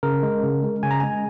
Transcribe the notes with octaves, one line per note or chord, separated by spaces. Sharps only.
C#3 A#4
G#3
C#3
G#3
C#3 G#5
A#5
G#3 G#5